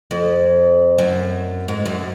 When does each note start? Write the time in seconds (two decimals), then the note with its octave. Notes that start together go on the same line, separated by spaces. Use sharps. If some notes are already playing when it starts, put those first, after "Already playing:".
0.11 F2
0.98 F#2
1.68 G#2
1.86 F#2